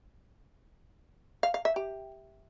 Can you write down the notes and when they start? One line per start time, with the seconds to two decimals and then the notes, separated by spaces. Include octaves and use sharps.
1.43 F5
1.54 F5
1.65 E5
1.76 G4